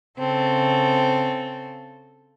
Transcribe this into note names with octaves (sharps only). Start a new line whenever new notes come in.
C#3 C4 A4